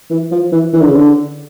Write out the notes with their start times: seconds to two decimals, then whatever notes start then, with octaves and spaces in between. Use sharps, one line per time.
0.10 E3
0.32 F3
0.52 E3
0.73 E3
0.81 D3
0.88 C#3
0.96 D3